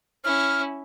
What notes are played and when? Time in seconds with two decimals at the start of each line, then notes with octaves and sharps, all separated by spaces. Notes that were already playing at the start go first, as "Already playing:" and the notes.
0.24 C#4 E4 F6